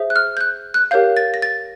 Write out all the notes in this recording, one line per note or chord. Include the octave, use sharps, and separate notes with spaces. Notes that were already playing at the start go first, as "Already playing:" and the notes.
Already playing: G#4 C5 E5
F#6
F6
G6
F#6
F#6
G4 A#4 C#5 F5 G6
A6
A#6
A6